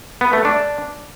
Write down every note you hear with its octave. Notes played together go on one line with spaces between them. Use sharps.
B3
A3
D4